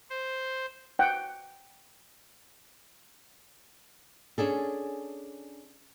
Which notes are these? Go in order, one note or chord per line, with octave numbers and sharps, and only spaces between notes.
C5
F#5 G5
C#4 D4 G#4 A4